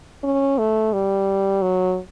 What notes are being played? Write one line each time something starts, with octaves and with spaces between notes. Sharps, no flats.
C#4
A3
G3
F#3